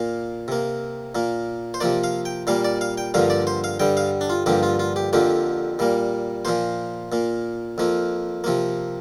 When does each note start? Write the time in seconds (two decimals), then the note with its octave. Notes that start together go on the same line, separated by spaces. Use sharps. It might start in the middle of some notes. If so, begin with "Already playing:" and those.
Already playing: A#2 A#3 F5
0.48 C3 A#3
1.15 A#2 A#3
1.74 C5
1.81 C3 F3 A#3 D5
2.04 F5
2.25 G5
2.47 A#2 G3 A#3 F5
2.65 D5
2.81 F5
2.98 G5
3.14 G2 D3 F3 A#3 F5
3.30 D5
3.47 C5
3.64 F5
3.80 G2 D3 G3 G5
3.97 F5
4.21 D4
4.30 F4
4.46 G2 D3 F3 A#3 G4
4.63 F4
4.80 F4
4.96 G4
5.13 F2 D3 F3 A#3 G4
5.79 A#2 G3 A#3
6.45 A#2 F3 A#3 C5
7.12 A#2 A#3
7.78 F2 F3 A#3
8.44 C3 F3 A#3